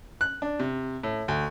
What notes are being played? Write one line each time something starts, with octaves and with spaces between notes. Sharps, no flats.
F#6
D4
C3
A2
D2